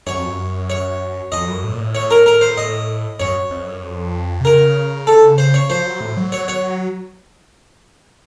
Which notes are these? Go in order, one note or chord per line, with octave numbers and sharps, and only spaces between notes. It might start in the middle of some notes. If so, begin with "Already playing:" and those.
F#2 C#5
F2
F#2
C#5
F2 D#5
F#2
A2
A#2
A2
C#5
A#4
A#4
C5
D#5
F#2 C#5
F2
F#2
F2
C3
C#3 A#4
A4
C5
C#5
F3 C5
F#3
A2
F#3
C#5
C#5